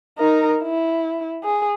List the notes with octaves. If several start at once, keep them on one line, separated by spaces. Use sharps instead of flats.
D#4 A#4
E4
G#4